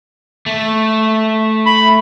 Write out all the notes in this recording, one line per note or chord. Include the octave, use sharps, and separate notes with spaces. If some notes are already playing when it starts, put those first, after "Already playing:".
A3
B5